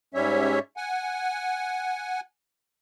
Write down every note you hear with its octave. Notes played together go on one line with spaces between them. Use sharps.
G#2 G3 C#4 C#5 E5
F#5 G#5